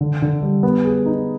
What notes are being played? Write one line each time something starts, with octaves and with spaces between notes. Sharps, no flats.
D3
D3
G3
B3
G#4
D#4